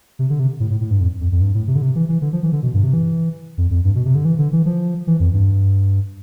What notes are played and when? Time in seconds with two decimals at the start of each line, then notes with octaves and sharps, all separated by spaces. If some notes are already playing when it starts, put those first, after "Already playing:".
0.19 C3
0.30 D3
0.40 C3
0.60 A2
0.71 A2
0.81 A2
0.91 G2
1.01 F2
1.21 F2
1.32 F2
1.41 G2
1.54 A2
1.68 C3
1.76 D3
1.82 C3
1.95 E3
2.09 E3
2.22 D3
2.33 F3
2.43 E3
2.52 D3
2.62 B2
2.74 G2
2.83 C3
2.93 E3
3.58 F2
3.71 F2
3.85 G2
3.95 B2
4.05 C3
4.15 D3
4.25 E3
4.39 D3
4.53 E3
4.66 F3
5.07 E3
5.20 F2
5.33 G2